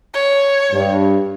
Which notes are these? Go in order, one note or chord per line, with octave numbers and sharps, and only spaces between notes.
C#5
G2